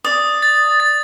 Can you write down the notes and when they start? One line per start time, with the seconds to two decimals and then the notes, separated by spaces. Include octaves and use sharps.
0.04 D5 D#6
0.42 A6
0.80 A6